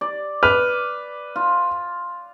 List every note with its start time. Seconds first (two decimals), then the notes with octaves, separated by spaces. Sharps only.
0.01 D5
0.43 B4 F6
1.36 F4